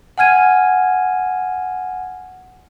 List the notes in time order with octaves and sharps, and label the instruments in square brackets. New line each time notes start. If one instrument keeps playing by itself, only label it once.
[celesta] F#5 G#5 F6 G#6 D#7